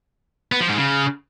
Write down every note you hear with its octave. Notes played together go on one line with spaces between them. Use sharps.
B3
F3
G#2
C#3